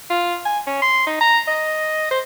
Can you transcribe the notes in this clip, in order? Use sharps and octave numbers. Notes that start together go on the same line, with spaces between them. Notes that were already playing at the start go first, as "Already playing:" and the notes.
F4
G#5
C#4
C6
D#4
A#5
D#5
C5